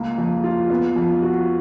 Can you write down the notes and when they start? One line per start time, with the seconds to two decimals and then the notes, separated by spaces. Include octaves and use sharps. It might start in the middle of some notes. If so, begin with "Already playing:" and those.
Already playing: C#2 A#3
0.18 F2
0.44 F4
0.70 B3
0.96 F2
1.22 F#4